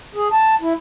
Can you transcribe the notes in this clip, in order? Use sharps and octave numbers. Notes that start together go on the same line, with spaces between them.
G#4
A5
E4